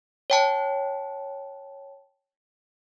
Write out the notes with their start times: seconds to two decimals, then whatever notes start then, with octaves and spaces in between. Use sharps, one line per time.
0.30 C#5 G5 A5